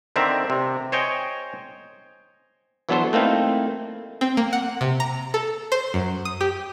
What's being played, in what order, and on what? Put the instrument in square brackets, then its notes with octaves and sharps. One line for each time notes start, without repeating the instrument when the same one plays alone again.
[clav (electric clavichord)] D3 D#3 C4 D5 E5 A#5
C3
C5 C#5 D#5 G5 G#5
E3 F#3 B3 D4 A4 C5
A3 A#3 C4 D#4 E4
[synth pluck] C4
A#3
F#5
C3
A#5
A4
C5
F#2
D#6
G4